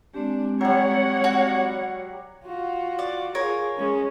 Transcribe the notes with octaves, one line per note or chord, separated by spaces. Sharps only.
G#3 C4 D4 G4
F#3 G3 C#5 F#5
F#4
F4 F#4
D5
F4 G#4 A#4 C#5
G#3 C#4